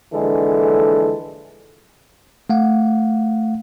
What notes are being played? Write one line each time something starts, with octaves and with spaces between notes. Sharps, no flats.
A#1 D3 E3 G#3 A4
A3 F5 F#5